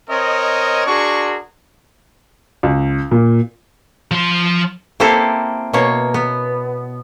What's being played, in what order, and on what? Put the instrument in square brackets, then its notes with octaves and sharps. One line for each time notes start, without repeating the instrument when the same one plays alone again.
[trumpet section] C4 A#4 C#5 D#5
D4 F#4 G#4 A#4 C6 C#6
[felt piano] C#2
A#2
[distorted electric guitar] F3 C6
[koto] A#3 C4 E4 G4 A4 C5
B2 A#3 C#5
B3